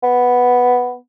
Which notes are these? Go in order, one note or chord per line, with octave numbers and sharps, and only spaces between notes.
B3